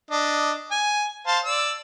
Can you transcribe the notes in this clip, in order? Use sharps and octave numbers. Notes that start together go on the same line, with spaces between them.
D4 D#5
G#5
C5 F5 A5
D5 E6